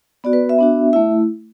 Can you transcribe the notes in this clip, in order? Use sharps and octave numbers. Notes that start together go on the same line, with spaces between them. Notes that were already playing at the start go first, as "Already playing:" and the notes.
B3 F#4 D5
B4
E5
B3 D4 F#4
A3 E4 E5